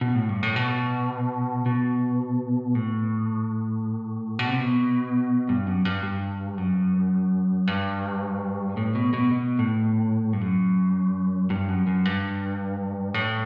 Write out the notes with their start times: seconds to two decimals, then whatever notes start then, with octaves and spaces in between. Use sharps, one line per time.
0.01 B2
0.15 A2
0.29 G2
0.43 A2
0.56 B2
1.66 B2
2.75 A2
4.39 B2
4.49 C3
4.60 B2
5.49 G2
5.67 F#2
5.85 G2
6.03 G2
6.58 F#2
7.67 G2
8.77 A2
8.95 B2
9.14 B2
9.31 B2
9.59 A2
10.33 G2
10.41 F#2
11.50 G2
11.68 F#2
11.87 F#2
12.05 G2
13.14 A2